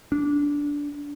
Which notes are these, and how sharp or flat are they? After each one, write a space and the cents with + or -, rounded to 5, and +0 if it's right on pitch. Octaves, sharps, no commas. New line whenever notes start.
D4 -15